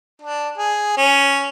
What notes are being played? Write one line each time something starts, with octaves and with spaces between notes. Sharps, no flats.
D4
G#4
C#4